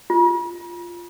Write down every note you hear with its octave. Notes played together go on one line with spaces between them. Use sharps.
F4